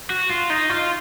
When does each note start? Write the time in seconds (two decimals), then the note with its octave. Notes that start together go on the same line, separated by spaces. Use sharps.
0.10 F#4
0.30 F4
0.50 D#4
0.70 F4